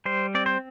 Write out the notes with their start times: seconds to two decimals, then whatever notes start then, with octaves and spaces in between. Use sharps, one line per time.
0.06 G3 C5
0.35 C4 D5
0.46 C5